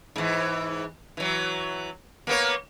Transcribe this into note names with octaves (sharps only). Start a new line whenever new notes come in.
G#2 E3
E3 F#3
A#3 B3 C#5